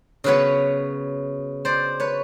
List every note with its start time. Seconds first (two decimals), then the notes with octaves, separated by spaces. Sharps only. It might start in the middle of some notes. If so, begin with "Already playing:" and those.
0.24 C#3 F#3 B3 B4 C#5
1.65 C5 D5
2.00 B4 C#5